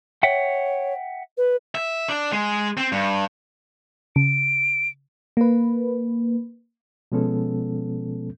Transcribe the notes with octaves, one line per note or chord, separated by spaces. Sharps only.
C#5 E5 F#5 G5
B4
E5
D4
G#3
C4
G2
C#3 D7
A#3 B4
B2 F3 G#3 B3 C#4 A4